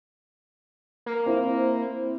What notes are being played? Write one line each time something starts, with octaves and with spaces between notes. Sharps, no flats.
A#3
C4 E4